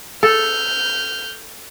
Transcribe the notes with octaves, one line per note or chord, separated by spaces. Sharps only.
A4 F6 G6